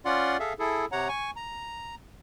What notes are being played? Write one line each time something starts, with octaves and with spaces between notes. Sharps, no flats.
C#4 F4 D5 F#5 C6
G#4 A4 E5 F5
E4 G#4 A4
C3 C#5 F#5 A#5
G#5 C#6
A#5